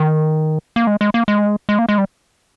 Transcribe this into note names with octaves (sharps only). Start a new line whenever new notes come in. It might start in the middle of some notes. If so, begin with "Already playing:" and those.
Already playing: D#3
A#3
G#3
G#3
A#3
G#3
G#3
A#3
G#3
G3